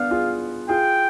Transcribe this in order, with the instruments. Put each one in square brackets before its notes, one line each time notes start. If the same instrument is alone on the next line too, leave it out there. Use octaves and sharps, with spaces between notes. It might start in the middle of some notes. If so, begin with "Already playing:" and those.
Already playing: [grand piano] B3 D4 [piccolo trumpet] F5
[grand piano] F4 G#4
[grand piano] F4 G#4 [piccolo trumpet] G5